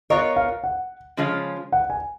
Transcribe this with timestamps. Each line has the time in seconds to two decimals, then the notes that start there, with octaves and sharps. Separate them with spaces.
0.10 B3 F4 A#4 C#5 D#5
0.36 F5
0.64 F#5
1.17 C#3 F3 G#3 C#4 F4
1.72 F#5
1.90 G#5